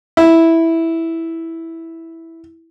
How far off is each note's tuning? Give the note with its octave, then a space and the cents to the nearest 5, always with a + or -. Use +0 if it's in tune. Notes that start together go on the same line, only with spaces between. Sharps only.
E4 -5